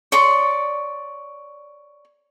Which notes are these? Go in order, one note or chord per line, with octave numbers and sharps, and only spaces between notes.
C#5 D5 C6 C#6